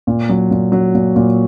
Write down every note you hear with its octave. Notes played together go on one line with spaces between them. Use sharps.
A#2
F#3
A#2
F#3
A#2
A#2